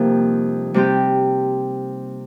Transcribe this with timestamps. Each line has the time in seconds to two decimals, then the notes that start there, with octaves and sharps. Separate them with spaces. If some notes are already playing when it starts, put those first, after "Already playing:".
Already playing: F2 C3 G3 A#3 D#4
0.74 C3 G3 C4 G4